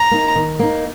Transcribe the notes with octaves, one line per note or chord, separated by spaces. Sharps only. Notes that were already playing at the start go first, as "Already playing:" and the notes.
Already playing: A#5
A#3 D#4
D#3
A#3 D#4